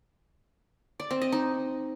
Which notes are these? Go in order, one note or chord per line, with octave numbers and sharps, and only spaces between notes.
D5
C4
D#5
D#4